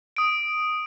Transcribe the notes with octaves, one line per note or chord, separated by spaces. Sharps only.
D#6 D7